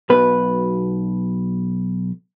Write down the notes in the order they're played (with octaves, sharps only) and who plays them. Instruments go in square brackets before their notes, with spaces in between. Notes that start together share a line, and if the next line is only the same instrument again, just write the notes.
[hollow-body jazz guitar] B1 B2 B4